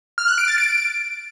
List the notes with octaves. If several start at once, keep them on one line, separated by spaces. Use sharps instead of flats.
F6
F#6
D7
A6
D7